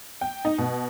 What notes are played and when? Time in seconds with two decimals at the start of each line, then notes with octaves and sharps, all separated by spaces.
0.21 G5
0.45 D#4
0.58 B2